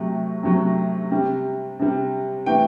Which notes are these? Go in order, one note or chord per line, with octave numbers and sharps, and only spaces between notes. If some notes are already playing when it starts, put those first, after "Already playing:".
Already playing: C3 F#3 A3
C3 F#3 A3
C3 G3
C3 G3
C3 E3 A3 G5